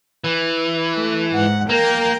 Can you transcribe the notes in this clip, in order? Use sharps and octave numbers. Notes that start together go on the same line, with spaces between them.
E3
A3
G#2 F#5
A#3 A#4 G5